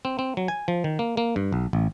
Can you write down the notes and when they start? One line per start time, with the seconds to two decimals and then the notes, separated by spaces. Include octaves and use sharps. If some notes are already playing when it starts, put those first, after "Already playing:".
0.05 C4
0.19 C4
0.37 F#3
0.48 G#5
0.68 F3
0.84 D#3
0.99 A#3
1.17 A#3
1.36 G2
1.52 B1
1.73 A1